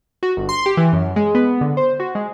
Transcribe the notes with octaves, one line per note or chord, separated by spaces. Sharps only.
F#4
G1
C6
G4
E3
F#2
G#3
B3
D3
C5
F#4
G#3